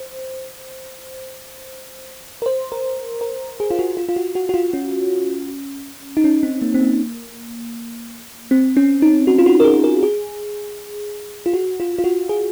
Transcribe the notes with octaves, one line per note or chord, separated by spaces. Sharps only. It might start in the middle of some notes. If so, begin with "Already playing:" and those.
Already playing: C5
A#4
C5
A#4
A#4
G#4
F4
F#4
F4
F4
F#4
F#4
F#4
F4
C#4
D#4
C#4
C4
A#3
C4
A#3
C4
C#4
D#4
F#4
F4
F#4
A#4
G#4
A#4
G#4
F4
F#4
F4
F4
F#4
G#4